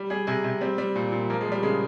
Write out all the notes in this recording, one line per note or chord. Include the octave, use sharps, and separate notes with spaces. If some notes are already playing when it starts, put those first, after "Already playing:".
Already playing: G3
G3 G#4
C3 G#4
C3
G3 C4
G3
A#2
A#2
F3 A#3
G#3
F3
G3
C#3 G#3